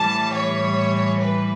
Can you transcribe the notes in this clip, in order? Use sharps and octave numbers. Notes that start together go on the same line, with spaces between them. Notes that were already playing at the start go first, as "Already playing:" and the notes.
Already playing: A2 E3 G3 A5
C#5
B4